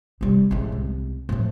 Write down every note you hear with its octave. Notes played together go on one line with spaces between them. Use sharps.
C3 G3
A1 G#3
C2
A2 F3